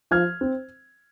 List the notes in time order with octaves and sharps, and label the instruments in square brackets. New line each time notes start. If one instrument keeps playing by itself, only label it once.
[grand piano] F3 F6 G#6
C4